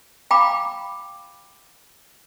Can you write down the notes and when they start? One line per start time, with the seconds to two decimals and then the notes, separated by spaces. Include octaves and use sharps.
0.31 F5 G5 A#5 B5 D6